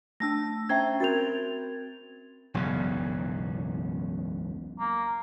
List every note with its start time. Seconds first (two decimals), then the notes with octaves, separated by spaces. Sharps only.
0.20 A3 D4 A5 E6 A#6
0.69 C#4 C5 E5 G5 A#5 G#6
1.00 C4 F#4 A#4 G#6 A6 F7
2.54 E1 B1 F#2 C#3
4.80 A#3